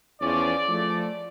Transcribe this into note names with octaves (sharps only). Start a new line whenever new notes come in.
E2 F3 C#4 D5
F3 A3